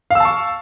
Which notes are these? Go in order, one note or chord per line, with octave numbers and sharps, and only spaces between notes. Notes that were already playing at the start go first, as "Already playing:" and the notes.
F5 A5 C#6 E6